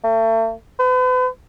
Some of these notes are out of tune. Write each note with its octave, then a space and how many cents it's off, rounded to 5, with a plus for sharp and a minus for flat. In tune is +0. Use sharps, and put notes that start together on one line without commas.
A3 +40
B4 +40